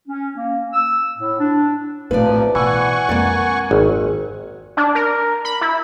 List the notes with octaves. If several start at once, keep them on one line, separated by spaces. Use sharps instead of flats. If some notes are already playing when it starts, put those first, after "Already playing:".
C#4
A#3
E6
A2
D4
A#1 A2 C3 F3 B4 D5
B2 E3 F#5 G#5 C#6
F2 G#3 A#3 D5
G#1
D4
A#4
B5
E4